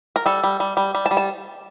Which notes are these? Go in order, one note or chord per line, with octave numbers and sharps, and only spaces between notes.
A#4
G3 A4
G3
G3
G3
G3
A5
G3
A5